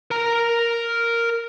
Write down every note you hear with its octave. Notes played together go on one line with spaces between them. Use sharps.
A#4 A#5